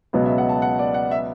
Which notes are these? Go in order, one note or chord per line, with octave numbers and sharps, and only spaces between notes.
C#2 B2 F#3 B3
E5
F#5
A5
F#5
D5
F#5
E5